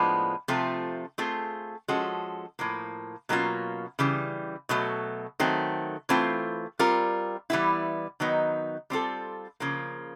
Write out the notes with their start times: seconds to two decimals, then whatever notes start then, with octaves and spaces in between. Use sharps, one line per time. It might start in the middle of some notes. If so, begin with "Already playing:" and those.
Already playing: A2 F3 G#3 B3 D4
0.48 C3 F3 A3 C4 F4
1.18 A3 C4 F4 G#4
1.88 F3 G#3 C#4 F#4 A4
2.59 A2 F3 A#3
3.29 B2 F#3 A#3 C#4 F4
3.99 C#3 E3 G3
4.69 B2 F#3 A3
5.40 D#3 F#3 A3 C4
6.09 E3 A3 C4 F4
6.79 G3 C4 F4 A#4
7.50 E3 G3 B3 E4
8.20 D#3 F#3 B3 D#4
8.90 G3 C4 F4 A4
9.60 C#3 F3 A#3